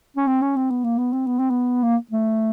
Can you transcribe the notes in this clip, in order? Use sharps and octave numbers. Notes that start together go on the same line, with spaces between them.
C#4
C4
C#4
C4
B3
A#3
B3
C4
B3
C4
B3
A#3
A3